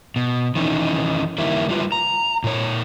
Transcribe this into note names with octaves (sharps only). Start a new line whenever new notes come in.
B2
D#3 E3 F#3 C#4 D#4
D#3 G3 A#3 E4
G3 F4 B4
A#5
A#2 C#5